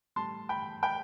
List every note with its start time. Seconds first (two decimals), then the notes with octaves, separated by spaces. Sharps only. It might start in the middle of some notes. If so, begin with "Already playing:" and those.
0.16 A2 G3 A5 C6
0.49 G5 B5
0.83 G5 B5